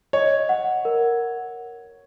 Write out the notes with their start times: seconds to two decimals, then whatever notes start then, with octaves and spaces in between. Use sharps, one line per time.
0.13 C#5 D#5
0.49 F#5
0.85 A#4